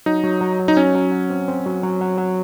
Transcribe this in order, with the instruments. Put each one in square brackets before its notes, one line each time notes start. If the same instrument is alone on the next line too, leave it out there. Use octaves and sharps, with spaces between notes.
[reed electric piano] F#3 [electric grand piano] D#4
[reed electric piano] F#3
F#3
F#4
[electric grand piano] D#4
[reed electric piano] F#3 [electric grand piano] C#4
[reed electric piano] F#3
F#4
C4
C4
F#3
F#3
F#3
F#3